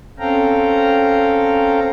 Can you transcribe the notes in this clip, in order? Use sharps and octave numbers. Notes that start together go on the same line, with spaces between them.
C4 C#4 A4 F5 G5 A#5